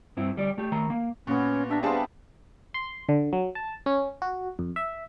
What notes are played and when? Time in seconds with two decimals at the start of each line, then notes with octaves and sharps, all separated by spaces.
0.17 G2 C4 E4
0.36 D2 G3 D5
0.58 A3 G4
0.72 D#3 A3 A#5
0.90 A#3
1.27 A#2 B3 C#4 F#4
1.69 D4 G4 E5 A#5
1.83 G3 B3 C4 D4 G#4 F5 A5
2.74 C6
3.09 D3
3.33 F#3
3.55 A5
3.86 C#4
4.22 F#4
4.59 F2
4.76 E5